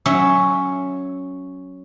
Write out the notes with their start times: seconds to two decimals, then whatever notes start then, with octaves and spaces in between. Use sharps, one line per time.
0.06 F#3 C#4 E5